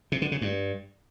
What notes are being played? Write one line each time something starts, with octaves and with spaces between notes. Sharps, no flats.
C3
D3
C#3
G2